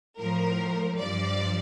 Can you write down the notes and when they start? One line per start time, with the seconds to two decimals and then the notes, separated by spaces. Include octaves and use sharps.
0.18 A2 F3 A#4
0.98 G2 F3 D5